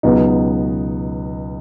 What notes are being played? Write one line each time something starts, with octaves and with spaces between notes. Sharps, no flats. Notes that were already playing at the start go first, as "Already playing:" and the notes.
C#2 B2 F#3 B3 D#4